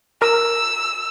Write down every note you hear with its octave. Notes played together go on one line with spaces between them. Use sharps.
A#4 E6